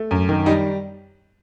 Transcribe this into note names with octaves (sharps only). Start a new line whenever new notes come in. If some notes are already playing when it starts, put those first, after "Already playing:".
Already playing: A3
F#2
D#3
G3 D#4